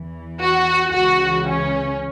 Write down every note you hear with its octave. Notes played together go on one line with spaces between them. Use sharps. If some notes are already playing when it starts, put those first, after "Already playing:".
Already playing: E2 E3
F#4
C#2 C#3 E3 F#4
C#4